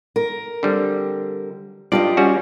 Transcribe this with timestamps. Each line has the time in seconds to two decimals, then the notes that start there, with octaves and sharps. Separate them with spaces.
0.16 A#4
0.63 D3 G3 C4
1.92 G2 F4 G4 D5 D#5
2.17 G3 C#4 F#4